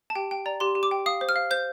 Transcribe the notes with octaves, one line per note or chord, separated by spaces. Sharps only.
A5
G4 G5
G5
D5 A#5
G4 C6
G4
D6
G5
F5 D#6
C5
F6
F5
C5 G6